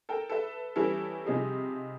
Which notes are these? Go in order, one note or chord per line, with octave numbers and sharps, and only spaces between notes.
A4 A#4 G5
A4 B4 E5
E3 G3 B3 C#4 E4 A4
C3 F3 G3 D#4 G#4